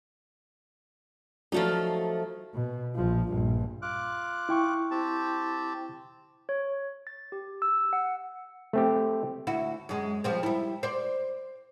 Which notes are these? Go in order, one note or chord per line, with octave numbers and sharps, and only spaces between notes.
F3 F#3 A3 D#4 F#4 D5
B2
A#1 F3
A#1 G2
F4 D6 F#6
E4 G5 C#6
C4 G4 A5
C#5
A6
G4
E6
F#5
A3 C4 G4
D2 E4 F#4
F#2 G#3
F3 G3 C4
G3 E4
C5 D5